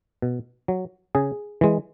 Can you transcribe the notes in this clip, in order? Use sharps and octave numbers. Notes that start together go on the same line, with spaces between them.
B2
F#3
C#3 G#4
E3 G#3